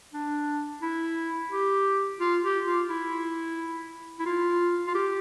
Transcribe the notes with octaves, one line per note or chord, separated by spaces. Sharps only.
D4
E4
G4
F4
G4
F4
E4
E4
F4
F4
G4